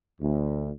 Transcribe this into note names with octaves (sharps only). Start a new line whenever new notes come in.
D2